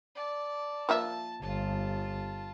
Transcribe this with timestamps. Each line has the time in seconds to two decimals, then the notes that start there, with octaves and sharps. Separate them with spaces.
0.15 D5 A5
0.89 F3 A#3 E5 A5
1.42 G1 F4 A5